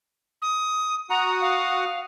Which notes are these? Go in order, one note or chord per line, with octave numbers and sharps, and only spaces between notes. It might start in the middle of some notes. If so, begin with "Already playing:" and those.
D#6
F#4 F#5 A#5 D#6
F5